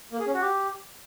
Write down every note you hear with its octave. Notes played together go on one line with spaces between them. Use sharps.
A#3
G#4
C#4
F#4
G4